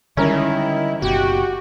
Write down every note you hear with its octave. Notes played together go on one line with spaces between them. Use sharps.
D3 D#3 G3 G#3 C#4 E4 A#4
F#1 B2 F#4 G4